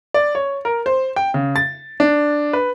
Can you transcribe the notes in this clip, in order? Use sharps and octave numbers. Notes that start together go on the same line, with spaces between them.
D5
C#5
A#4
C5
G5
C#3
A6
D4
B4